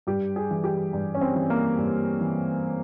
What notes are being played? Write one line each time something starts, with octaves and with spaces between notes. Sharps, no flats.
G2 G4
G#4
E3
G4
G2
C#4
C4
E3
A#3
G2
E3